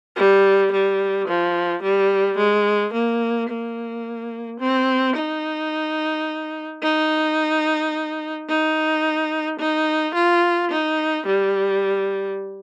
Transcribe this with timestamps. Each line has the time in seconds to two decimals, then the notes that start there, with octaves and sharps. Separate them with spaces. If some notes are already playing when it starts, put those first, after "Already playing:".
0.16 G3
0.72 G3
1.28 F3
1.83 G3
2.38 G#3
2.93 A#3
3.50 A#3
4.60 C4
5.16 D#4
6.83 D#4
8.49 D#4
9.59 D#4
10.15 F4
10.71 D#4
11.27 G3